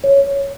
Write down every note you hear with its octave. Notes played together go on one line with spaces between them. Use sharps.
C#5